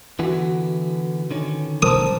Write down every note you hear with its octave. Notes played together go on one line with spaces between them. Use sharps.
D3 E3 B3 E4 F#4
D3 D#3 C#4
A#4 C5 A5 D#6